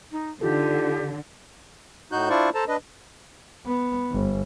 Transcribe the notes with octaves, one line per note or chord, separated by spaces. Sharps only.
D#4
D3 D#4 F4 G4 A4
A2 D#4 F#4 F#6 G6
D4 E4 F4 C5 D5 C#6
A4 C5 A5 A#5
D4 B4 D#5
B3
G1